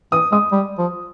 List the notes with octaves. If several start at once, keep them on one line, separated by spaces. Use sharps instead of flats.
E3 D#6
G#3 D#6
G3
F3